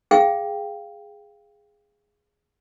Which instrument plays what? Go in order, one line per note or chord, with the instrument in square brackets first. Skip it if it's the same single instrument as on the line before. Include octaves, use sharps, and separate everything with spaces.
[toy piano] G#4 F5 G5